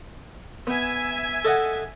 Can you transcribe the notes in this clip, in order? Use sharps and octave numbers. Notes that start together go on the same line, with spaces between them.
B3 E5 G#5
A4 D#5 F#5